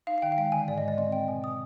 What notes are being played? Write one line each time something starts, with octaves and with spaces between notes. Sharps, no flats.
D#4 F5
F5
D#3 G5
F5
G#3 G5
D3 G#5
G#2 D5
G#3 D#5
D5
C4 D#5
C4 G5
B2 G#5
B2 D#6